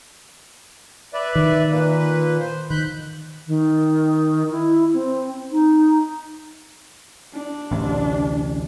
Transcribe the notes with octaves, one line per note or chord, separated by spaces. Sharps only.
B4 D5 E5
D#3
A#2 A#3 B4
C5
D#3 B5 F#6 G6
D#3
E4
C4
D#4
D4
A1 D2 C3